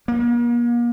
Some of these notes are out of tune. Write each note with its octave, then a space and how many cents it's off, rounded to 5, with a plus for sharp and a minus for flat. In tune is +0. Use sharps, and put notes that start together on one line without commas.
A#3 +40